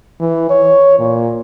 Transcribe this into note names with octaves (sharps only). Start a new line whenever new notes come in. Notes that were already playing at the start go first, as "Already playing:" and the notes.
E3
C#5
A#2